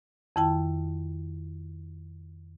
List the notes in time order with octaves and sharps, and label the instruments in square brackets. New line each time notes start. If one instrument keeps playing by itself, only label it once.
[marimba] F2 D#3 E4 G5 A5